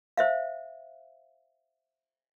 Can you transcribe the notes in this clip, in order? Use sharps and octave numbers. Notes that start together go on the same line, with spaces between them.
C5 E5 F5